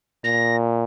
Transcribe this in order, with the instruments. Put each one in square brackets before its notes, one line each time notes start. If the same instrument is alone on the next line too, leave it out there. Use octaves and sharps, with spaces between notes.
[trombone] A#2 [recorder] A#6